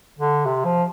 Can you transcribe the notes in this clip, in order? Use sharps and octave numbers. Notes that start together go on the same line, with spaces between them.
D3
C3
F3